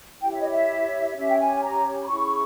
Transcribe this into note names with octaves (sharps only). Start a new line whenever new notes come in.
E4 G4 C#5 G5
E5
D#5
E5
C#4 G4 C#5 E5
G5
G#5
A#5
B5
C#4 E4 G#4 C#6